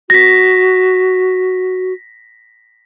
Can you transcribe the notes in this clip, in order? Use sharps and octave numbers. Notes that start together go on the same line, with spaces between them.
F#4 A#6 B6